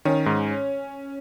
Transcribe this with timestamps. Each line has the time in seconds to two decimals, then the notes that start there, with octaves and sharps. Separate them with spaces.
0.05 D#3 C#4
0.26 G#2